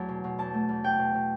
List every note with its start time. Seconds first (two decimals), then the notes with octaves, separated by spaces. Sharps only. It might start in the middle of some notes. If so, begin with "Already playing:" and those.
Already playing: E2 F#3 A3 D4 A5
0.09 B2
0.24 B2
0.38 E2 A5
0.54 A3
0.69 E2
0.84 B2 G5
0.99 B2
1.14 B2